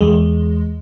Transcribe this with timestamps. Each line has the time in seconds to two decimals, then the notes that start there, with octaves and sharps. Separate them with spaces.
0.01 E2 G#3